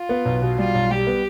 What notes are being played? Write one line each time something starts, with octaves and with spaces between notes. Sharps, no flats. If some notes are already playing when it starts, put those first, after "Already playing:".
Already playing: F4
B3
B1
B2
G3 F4
B1
G3 G4
B3